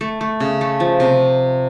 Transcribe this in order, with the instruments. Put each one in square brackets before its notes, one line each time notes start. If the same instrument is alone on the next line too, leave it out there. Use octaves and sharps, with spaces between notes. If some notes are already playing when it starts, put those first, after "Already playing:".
[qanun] A3
A3
C#3
A3
F3
C3